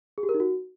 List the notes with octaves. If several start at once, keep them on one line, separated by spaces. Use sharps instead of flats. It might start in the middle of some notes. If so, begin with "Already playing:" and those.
G#4
G4
A#4
D#4
F#4